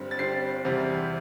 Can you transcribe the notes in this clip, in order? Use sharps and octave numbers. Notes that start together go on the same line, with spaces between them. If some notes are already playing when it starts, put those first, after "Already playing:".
Already playing: G1 G2 G3 C4
A6
G1 G2 G3 C4 C7
E2 C3 G3